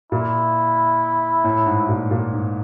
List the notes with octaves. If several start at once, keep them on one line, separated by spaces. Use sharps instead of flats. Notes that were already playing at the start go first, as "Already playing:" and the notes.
A#2 E4
A2
G#2
A#2
A#2
G#2